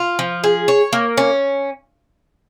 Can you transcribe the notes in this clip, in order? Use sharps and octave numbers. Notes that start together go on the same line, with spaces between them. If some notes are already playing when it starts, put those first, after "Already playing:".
Already playing: F4
F3
G#4
C#5
A#3
C#4